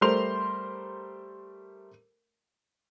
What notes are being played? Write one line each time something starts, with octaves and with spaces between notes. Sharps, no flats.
G3 A3 A#4 C5 C6 F7